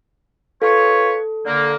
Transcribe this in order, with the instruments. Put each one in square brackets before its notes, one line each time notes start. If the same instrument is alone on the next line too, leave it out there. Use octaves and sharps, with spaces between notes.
[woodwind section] F4 B4 C#5 [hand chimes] A4
[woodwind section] D3 A#3